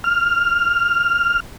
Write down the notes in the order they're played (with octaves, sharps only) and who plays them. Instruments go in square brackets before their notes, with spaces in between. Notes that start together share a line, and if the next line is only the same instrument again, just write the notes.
[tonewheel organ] F6